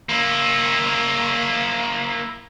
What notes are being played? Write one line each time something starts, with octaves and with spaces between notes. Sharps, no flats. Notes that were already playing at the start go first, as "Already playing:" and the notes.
A#3 E4